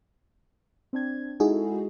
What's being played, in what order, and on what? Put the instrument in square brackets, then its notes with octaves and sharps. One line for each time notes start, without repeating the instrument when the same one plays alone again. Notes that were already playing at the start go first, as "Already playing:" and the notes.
[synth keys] C4 D4 G#6
[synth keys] G#3 E4 A4 [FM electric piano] D#4 F#4 G#4